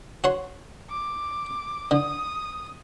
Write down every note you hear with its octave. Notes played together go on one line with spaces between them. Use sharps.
F#4 C#5 C6
D6
D3 D#6